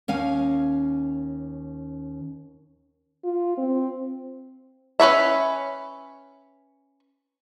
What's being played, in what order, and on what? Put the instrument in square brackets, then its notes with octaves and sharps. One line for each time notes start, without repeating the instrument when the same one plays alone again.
[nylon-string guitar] D#2 C#4 F5 G#5
[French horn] F4
C4
[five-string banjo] C#4 B4 C#5 E5